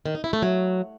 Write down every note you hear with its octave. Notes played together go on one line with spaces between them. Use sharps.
D#3
D#4
E4
A3
F#3